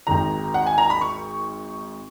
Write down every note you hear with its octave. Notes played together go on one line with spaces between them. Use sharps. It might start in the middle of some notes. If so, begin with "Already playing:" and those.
G#1 G#2 D#3 A#5
F#5
G#5
A#5
B5
C#6